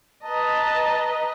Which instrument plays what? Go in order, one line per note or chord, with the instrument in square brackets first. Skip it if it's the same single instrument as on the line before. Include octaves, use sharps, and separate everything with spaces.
[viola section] B4 D#5 [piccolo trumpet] A5 [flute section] A#5